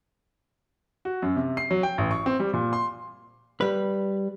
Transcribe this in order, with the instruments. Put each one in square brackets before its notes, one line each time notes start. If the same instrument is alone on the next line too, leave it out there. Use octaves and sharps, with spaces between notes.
[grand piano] F#4
F#2
C3
C7
F#3
G5
A1
C#6
C4
G3
A#2
C6
[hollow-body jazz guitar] G3 B4